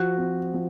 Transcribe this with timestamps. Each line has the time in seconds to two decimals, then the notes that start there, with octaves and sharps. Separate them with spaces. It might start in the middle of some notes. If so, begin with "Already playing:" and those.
Already playing: F3 F#4
0.17 C4
0.54 F3